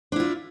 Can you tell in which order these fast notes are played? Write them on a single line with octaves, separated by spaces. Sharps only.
D4 E4 F4